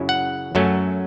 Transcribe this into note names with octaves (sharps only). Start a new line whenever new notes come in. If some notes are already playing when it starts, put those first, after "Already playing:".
Already playing: F#2 C#3 F#3 C#4 E4
F#5
F#2 F#3 A3 C#4